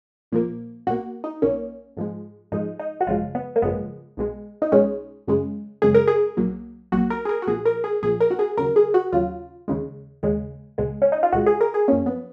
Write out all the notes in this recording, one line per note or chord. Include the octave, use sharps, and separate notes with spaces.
A#1 A#2 F3 A#3
B1 B2 A#3 F#4
D#4
B1 B2 A#3 C#4
G#2 F3 G#3
G#2 F3 G#3 D#4
D#4
F#4
G#1 F#2 C#3 F3 G#3 F4
B3
A#3
G#1 F#2 C#3 F3 G#3 B3
B1 B2 G#3
D#4
B1 B2 G#3 C#4
F#2 C#3 G#3
F#2 C#3 G#3 G#4
A#4
G#4
B1 B2 F#3 A#3
B1 B2 F#3 A#3 F#4
A#4
G#4
A#4
F#4
B1 A#2 F3 G#4
A#4
G#4
B1 A#2 F3 G#4
A#4
F#4
G#4
D#2 C#3 F#3 A#4
G#4
F#4
D#2 C#3 F#3 F4
D#2 C#3 G#3
D#2 C#3 G#3
C#2 B2 G#3
C#4
D#4
F4
C#2 B2 G#3 F#4
G#4
A#4
G#4
F#2 F3 A#3 C#4
B3